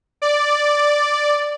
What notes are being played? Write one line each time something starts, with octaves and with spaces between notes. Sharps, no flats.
D5